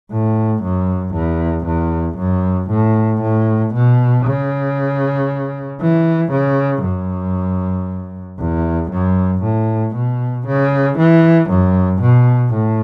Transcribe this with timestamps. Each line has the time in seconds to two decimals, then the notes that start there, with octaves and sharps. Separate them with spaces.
0.11 A2
0.62 F#2
1.14 E2
1.66 E2
2.18 F#2
2.70 A2
3.22 A2
3.73 B2
4.25 C#3
5.81 E3
6.32 C#3
6.84 F#2
8.39 E2
8.91 F#2
9.42 A2
9.94 B2
10.47 C#3
10.98 E3
11.49 F#2
12.01 B2
12.53 A2